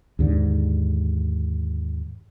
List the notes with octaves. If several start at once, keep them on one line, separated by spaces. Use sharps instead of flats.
D#2 G#2 D3